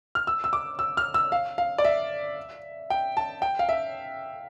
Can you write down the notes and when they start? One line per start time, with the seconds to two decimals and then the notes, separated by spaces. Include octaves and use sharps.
0.15 F6
0.27 E6
0.44 E6
0.53 D6
0.79 E6
0.97 F6
1.14 E6
1.32 F5
1.58 F5
1.78 D5
1.84 E5
2.90 G5
3.17 A5
3.42 G5
3.59 F5
3.69 E5